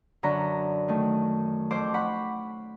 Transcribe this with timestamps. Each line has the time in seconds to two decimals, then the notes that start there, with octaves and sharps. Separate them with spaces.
0.23 F#2 D3 A#5 B5 C#6
0.88 D#3 A3
1.71 F2 C5 D6 G6
1.94 F#5 B5 C#6